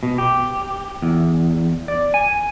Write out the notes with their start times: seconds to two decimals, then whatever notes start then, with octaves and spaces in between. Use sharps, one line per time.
0.03 B2
0.18 G4
1.02 E2
1.88 D5
2.14 G#5